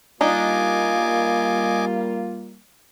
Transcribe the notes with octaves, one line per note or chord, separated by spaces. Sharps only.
G3 A#3 D4 D#4 F4 D#5 G#5 D6